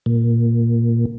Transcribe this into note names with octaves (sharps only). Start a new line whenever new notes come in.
A#2